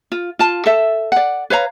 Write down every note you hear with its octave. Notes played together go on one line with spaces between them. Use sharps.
F4
F4 A5
A4 E5
D5 F#5
B4 C#5 F5 A#5